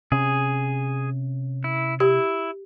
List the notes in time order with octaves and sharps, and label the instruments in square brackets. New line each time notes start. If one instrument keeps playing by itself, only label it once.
[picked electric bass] C3 C#4 [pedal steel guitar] G#4
[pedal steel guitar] E4
[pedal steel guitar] E4 [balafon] G4